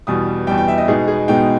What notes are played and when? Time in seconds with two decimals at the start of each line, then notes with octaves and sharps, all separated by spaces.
0.07 E2 B2 G3 D#6
0.47 E2 B2 G3 G5
0.58 G5
0.68 E5
0.78 D#5
0.88 B2 G#3 B3 D#4 G#4
1.08 G#4
1.28 B2 G#3 B3 D#4 G5